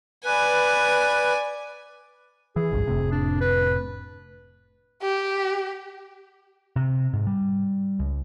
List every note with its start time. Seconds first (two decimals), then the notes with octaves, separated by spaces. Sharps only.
0.24 B4 D5 G#5
2.56 E3 G#4
2.72 G#1 C#2 G2
2.87 F1 A2 C3
3.12 D4
3.41 B4
5.03 G4
6.76 C3
7.13 G#2
7.27 G3
7.99 C#2